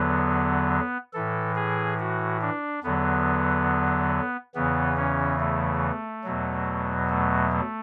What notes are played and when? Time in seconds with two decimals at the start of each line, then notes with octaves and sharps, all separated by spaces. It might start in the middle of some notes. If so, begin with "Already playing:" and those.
Already playing: E2 D3 F#3 B3
1.13 A2 E3 A4
1.56 G#4
2.00 F#4
2.41 D4
2.83 E2 D3 F#3 B3
4.55 E2 C#3 E3 B3
4.97 C#4
5.40 A3
6.24 E2 B2 F#3
7.10 A3
7.52 A3